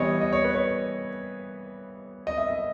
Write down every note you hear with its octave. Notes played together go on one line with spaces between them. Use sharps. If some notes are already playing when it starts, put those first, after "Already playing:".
Already playing: E3 G3 B3 C#5 D#5
D#5
C#5
B4
C#5
D#5
E5
D#5